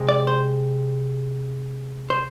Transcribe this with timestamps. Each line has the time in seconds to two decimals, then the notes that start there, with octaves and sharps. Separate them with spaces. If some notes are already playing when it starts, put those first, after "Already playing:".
Already playing: C3 G#3 C4
0.09 D5
0.27 C5
2.10 C5